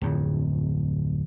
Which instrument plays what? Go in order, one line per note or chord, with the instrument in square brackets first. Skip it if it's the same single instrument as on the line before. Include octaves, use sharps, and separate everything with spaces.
[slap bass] D1 F2